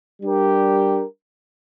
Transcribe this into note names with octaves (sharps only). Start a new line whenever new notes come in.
G3 D4 G4 A#4